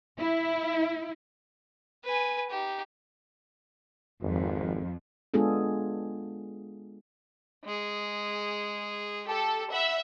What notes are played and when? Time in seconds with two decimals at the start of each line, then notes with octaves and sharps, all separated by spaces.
0.19 E4
2.05 B4 G#5
2.50 D#4 G4
4.22 G#1 F2
5.34 G#3 B3 D4 F4 G#4 A4
7.64 G#3 G#4
9.27 G4 A4
9.72 E5 F#5 B5